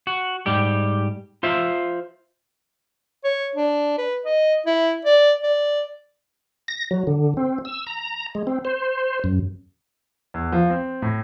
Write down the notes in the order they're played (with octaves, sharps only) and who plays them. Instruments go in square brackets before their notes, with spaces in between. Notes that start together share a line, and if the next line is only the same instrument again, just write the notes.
[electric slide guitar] F#4
G#2 G3 G4
F4 C5 E5
[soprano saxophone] C#5
D4
B4
D#5
E4
D5
D5
[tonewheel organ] A#6
F#3
D3
C4
E6
A#5
G#3
C4
C5
F#2
[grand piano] E2
F3
C4
A2